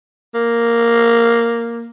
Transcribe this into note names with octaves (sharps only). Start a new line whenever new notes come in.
A#3